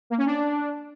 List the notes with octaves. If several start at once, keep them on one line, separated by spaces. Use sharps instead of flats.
A#3
C#4
D4